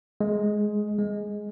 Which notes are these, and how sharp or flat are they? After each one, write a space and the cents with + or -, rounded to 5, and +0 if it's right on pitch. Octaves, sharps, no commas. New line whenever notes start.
G#3 +10
G#3 +5